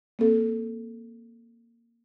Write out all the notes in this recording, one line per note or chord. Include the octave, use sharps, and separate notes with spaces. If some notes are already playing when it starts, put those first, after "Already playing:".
A#3 C4 A4